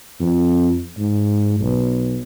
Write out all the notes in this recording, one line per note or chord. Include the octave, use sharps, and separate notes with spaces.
F2
G#2
B1